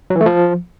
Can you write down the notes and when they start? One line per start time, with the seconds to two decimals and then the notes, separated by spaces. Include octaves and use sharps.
0.10 F#3
0.16 E3
0.21 A3
0.26 F3